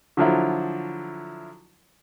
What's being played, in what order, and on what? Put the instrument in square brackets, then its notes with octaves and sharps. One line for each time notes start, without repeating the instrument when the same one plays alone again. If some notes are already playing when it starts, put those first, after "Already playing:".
[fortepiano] D3 F3 F#3 E4